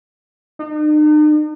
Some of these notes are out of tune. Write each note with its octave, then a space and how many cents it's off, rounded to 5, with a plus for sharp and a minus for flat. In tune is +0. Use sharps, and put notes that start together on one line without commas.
D#4 -45